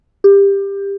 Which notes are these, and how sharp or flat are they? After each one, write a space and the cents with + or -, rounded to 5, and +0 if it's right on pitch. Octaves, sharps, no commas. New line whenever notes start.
G4 +20